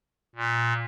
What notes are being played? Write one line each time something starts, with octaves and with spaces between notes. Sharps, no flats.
A#2